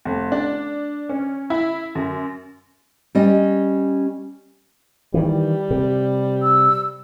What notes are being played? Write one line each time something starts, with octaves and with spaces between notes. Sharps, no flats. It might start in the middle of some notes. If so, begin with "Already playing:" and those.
F1
D4
C#4
E4
F#2
G3 C#4 D#5
D#3 E3 G3
C3
E6